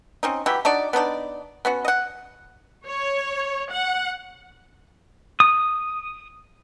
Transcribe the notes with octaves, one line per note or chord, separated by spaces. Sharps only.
C4 C#4 D#4
E3 F#3 E4 G4
D4 D#4 F#4 D5
B3 D4 D#4 D5
B3 C#4 F#4
D#5 F#5
C#5
F#5
D#6